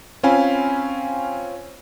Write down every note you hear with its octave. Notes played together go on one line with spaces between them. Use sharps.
C4 C#4 F4 F5 G#5 B5